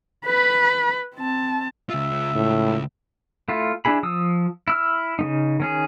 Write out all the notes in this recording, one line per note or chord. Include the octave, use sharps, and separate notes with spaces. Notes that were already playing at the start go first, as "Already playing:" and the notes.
B4 B5
C4 A5
C#2 F4 E5
A2
A3 E4 F4
D4 E4 G#4 B5
F3 D#6 E6
E4 E6 F6
C#3 A3 D#4
D#3 C#4 G#4